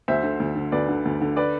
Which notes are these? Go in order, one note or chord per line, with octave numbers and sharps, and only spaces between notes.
D2 C5 E5
D3
D2
D3
D2 B4 D5
D3
D2
D3
B4 D5